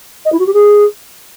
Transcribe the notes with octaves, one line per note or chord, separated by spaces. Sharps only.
D#5
E4
F#4
G4
G#4